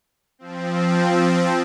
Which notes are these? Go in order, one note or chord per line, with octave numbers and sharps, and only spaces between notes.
F3 C4